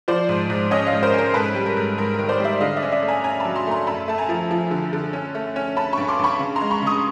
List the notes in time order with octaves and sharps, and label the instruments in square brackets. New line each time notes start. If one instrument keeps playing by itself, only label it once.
[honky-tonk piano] F3 C5 D5
G#2
G#2
C#4 C#5 D#5
D#5 F5
G#2
A#4 C5
C#4 A#4
G#2 A4 B4
G3
A#4
G#2
G#2 A#4
D#3 A#4
C5 D5
G3 D5 E5
D3 D#5 F5
D5 E5
C#4
D5 E5
A3
G#5 A#5
C#4 G#5 A#5
A5 B5
F#3
A#5 C6
A3 A#5 C6
F#2 A5 B5
A3 A5
G#5 A#5
F3
F3
D3
D3
C#4
A3
C#4
C#4 A5 B5
G2 B5 C#6
C6 D6
G2 B5 C#6
C#3
A#5 C6
G#3
B5 C#6
C#3 C#6 D#6